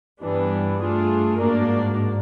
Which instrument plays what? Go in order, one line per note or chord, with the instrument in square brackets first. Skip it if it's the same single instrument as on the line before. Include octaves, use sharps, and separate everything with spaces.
[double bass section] G2 [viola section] E3 G3 B3 D4
[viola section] A3 D4 F4 G#4
[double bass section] G#2 [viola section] A#3 D4 F#4 A#4 D5